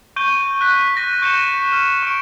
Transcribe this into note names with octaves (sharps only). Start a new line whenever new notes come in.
C#6 G6 D#7 G7
F#6 B6 D#7
C#6 A#6 D#7
C#6 G6 C#7 D#7 E7 G7
F6
C#6 D7